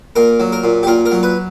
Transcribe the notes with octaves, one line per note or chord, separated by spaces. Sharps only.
A#2 A#4
F#3
A#4
A#2
G4
A#2 A#4
A#4
F#3
B4